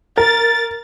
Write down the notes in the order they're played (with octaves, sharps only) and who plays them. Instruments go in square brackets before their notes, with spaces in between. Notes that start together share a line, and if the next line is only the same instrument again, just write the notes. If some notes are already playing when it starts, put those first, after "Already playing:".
[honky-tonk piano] A#4 [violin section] A6